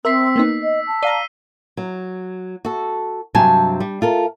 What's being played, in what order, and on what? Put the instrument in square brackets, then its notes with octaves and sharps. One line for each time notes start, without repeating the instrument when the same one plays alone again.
[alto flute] C4 [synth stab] A#4 E5 C6 [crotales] E6 B6 C7
[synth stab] A#3 B3 D#4
[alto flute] D#5
A5
[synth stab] D5 F5 A#5 [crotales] C7 D#7 G7
[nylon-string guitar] F#3
F#4 A4
G2 C3 F#3 C4 G#5 A5
G3
F4 A4 A#4